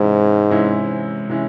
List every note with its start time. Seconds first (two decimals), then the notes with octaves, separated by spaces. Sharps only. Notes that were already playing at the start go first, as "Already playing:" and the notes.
Already playing: G#2 C3 E3 G#3 C#4 E4
0.50 C3 E3 G#3 C#4 E4
1.29 C3 E3 G#3 C#4 E4